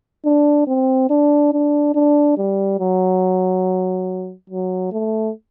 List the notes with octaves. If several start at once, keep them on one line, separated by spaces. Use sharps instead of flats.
D4
C4
D4
D4
D4
G3
F#3
F#3
A3